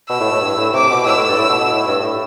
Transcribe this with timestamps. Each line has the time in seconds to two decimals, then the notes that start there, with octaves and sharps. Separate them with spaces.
0.09 B2 E6
0.20 A2
0.31 A2
0.42 G2
0.58 A2
0.74 C3 D6
0.90 B2
1.06 A2 E6
1.17 A2
1.28 G2
1.38 A2
1.49 B2
1.61 B2
1.71 A2
1.87 G2
2.03 A2